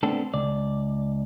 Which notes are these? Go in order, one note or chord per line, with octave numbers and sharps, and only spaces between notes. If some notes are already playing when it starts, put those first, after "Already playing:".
A3 B3 C4 D4 A4
C#2 D5